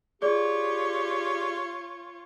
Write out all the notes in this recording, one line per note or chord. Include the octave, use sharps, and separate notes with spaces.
F4 G4 G#4 C#5 D5